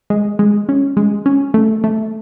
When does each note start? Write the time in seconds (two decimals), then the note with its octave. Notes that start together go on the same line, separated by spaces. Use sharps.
0.10 G#3
0.39 G#3
0.69 C#4
0.97 G#3
1.26 C#4
1.54 A3
1.84 A3